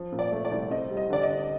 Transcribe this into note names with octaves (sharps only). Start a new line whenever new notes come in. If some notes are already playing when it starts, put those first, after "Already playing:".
Already playing: F3
A#2
D5
A3
D5
C2
C4 D#5
G3
D#5
D3 D5
D#5
D3